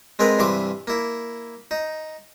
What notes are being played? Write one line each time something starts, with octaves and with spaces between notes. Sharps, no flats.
G#3 C4 G#4 A#4 B4
G2 C3 E3 C6 D6
A#3 E4
D#4